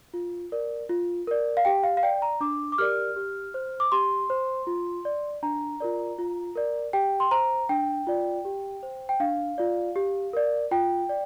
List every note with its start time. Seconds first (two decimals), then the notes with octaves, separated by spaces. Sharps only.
0.14 F4
0.52 A#4 D5
0.89 F4
1.27 A#4 D5
1.57 F5
1.65 G4 G5
1.84 F5
1.97 F5
2.03 D5 G5
2.22 A#5
2.41 D4 D6
2.72 D6
2.78 G4 A#4 D5 F6
3.16 G4
3.54 C5
3.80 D6
3.92 G4 C6
4.30 C5
4.67 F4
5.05 D5
5.43 D4 A#5
5.80 F4 A#4 D5
6.18 F4
6.56 A#4 D5
6.93 G4 G5
7.20 C6
7.31 C5 A#5
7.69 D4 G5
8.07 F4 D5
8.45 G4
8.83 C5
9.09 G5
9.20 D4 F5
9.58 F4 D5
9.96 G4
10.33 A#4 D5
10.71 F4 G5
11.09 D5